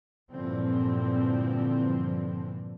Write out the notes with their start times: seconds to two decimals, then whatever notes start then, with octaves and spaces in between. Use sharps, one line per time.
0.31 G2 A#2 D3 E3 F3 C4